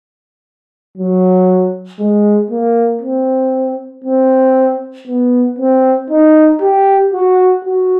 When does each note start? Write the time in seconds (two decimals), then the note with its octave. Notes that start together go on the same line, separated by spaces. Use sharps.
0.98 F#3
2.00 G#3
2.51 A#3
3.02 C4
4.04 C4
5.08 B3
5.59 C4
6.10 D#4
6.61 G4
7.13 F#4
7.65 F#4